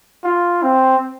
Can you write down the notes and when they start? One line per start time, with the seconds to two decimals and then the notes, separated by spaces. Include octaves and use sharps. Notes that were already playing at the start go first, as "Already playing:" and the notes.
0.24 F4
0.63 C4